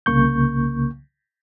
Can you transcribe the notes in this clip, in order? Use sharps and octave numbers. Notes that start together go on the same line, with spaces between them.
C2 C#3 A#3 C#6 G6